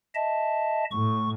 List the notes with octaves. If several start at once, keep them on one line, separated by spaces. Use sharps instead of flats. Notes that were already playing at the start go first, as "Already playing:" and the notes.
D#5 E5 A5
A2 C#6